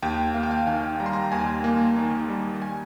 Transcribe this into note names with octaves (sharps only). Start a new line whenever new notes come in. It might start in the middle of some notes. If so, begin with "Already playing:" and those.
D#2 G5
A#3 F5
G5
F5
D#3 G#5
G3 A#5
C6
A#5
D#2 G#5
A#3
D#3
G3
G#5